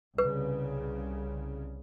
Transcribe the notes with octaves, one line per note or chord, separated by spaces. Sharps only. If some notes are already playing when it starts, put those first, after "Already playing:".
C2 C#3 B4